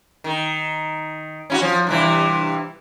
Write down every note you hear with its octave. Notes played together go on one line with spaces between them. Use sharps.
D#3
C#4 E4 F#4
F3
G2 C3 E3